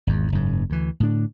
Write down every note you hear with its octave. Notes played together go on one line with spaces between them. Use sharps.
G#1 E2
F#1 G#2
D2 E3
A2 D3 D4